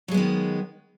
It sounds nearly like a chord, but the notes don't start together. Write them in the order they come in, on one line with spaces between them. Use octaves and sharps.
F#3 G#3 B3 D#3